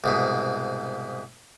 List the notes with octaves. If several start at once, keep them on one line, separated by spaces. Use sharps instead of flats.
C2 G#2 B2